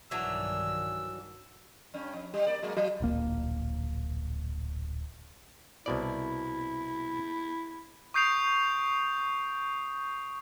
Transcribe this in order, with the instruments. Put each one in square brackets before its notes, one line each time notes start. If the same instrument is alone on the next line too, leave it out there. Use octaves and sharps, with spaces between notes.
[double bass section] B1 G2 D#3 [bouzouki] E3 F#3 D4 [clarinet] E6
[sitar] G2 C#4
F2
G3
A#3 D5
F#3 G#3 A#3
F#3
[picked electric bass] D1 A#1 A#3
[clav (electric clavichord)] C2 B2 D5 [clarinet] E4
[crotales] C#6 D#6 G6 C7 D7 F7